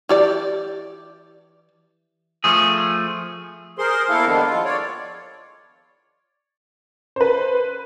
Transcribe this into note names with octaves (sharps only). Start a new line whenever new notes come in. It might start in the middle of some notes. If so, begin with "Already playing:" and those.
E3 G4 D5
F3 A3 G#4
G#4 A#4 C5 C6
E2 A#3 E4 A4 A#4 F5
D#3 F3 G#3 B3 D4
F4
C#5 D5
B4 C5